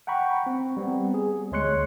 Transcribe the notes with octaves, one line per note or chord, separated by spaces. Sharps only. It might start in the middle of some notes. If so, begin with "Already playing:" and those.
F#5 G5 A#5 B5 C#6
C4
G3 B3 C4
G#4
D2 G#3 C#5 C6 F#6 C#7